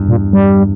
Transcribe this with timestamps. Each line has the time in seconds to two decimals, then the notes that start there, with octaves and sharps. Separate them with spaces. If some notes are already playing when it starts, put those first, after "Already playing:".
Already playing: E2 G2
0.09 A#2
0.33 G3